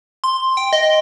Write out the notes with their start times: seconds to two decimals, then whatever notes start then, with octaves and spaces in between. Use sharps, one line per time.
0.24 C6
0.57 G5
0.73 D#5